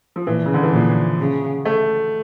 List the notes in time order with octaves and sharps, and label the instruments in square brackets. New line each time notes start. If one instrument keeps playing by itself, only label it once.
[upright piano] F3
[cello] A#2 [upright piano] E3
[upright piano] C#3
D3
E3
[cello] A#2 [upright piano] F3
[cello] C#3
[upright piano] A3